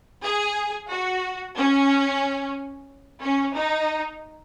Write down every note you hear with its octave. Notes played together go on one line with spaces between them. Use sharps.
G#4
F#4
C#4
C#4
D#4